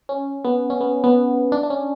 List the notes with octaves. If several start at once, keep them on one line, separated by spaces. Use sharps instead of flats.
C#4
B3
C#4
B3
B3
D4
D4
C#4